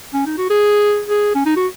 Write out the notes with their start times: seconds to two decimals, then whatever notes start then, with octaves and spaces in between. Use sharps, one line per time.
0.14 C#4
0.26 D#4
0.38 F#4
0.50 G#4
1.09 G#4
1.35 C#4
1.46 D#4
1.56 F#4